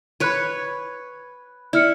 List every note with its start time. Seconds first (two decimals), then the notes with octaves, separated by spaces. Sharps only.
0.20 B4 C#5 B5 F#6 G#6
1.73 E4 D5 F6 C#7